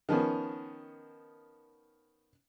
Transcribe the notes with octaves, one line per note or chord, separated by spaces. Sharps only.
D#3 F3 B3 C#4